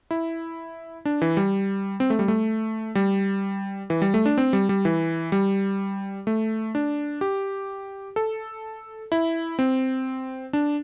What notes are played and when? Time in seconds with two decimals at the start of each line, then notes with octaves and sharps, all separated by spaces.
0.11 E4
1.05 D4
1.22 E3
1.37 G3
2.00 C4
2.10 A3
2.19 G3
2.28 A3
2.95 G3
3.90 E3
4.02 G3
4.14 A3
4.26 D4
4.38 C4
4.53 G3
4.69 G3
4.85 E3
5.32 G3
6.27 A3
6.75 D4
7.21 G4
8.16 A4
9.12 E4
9.59 C4
10.53 D4